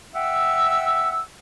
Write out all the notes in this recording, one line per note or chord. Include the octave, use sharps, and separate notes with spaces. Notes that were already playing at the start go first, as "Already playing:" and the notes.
E5 F#5 G5 E6